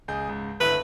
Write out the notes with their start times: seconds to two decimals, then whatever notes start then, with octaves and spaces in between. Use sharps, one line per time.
0.08 C#2 G#4 G6
0.29 C#2 G#2
0.60 G1 E4 B4 F#6